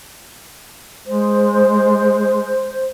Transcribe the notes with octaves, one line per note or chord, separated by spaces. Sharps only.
G#3 C5